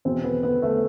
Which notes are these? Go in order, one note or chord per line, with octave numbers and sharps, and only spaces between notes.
E2 B2 C4
B3
B3
A3